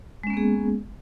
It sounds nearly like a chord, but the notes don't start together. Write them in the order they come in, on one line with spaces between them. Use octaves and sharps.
G#3 C#4 A#3 B3 G#4